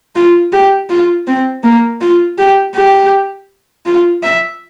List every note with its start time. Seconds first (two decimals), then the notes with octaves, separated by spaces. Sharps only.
0.16 F4
0.53 G4
0.90 F4
1.27 C4
1.64 A#3
2.01 F4
2.38 G4
2.75 G4
3.86 F4
4.23 E5